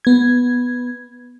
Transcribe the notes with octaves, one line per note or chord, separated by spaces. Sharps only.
B3 G#6